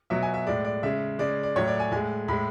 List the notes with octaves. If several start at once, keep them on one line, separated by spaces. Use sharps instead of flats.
B2 F#3 E5
G#5
E5
A2 G#3 D5
D5
C#3 G#3 E5
C#3 G#3 D5
D5
A2 F#3 C#5
D5
G#5
A2 G#3 G#5
A2 G#3 B5